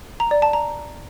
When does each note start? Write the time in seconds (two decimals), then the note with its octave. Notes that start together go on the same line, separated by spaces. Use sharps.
0.20 A#5
0.31 D5
0.42 A5
0.53 A#5